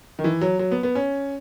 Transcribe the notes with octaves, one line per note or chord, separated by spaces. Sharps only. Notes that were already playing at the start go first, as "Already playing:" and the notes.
D#3
E3
F#3
F#3
B3
B3
C#4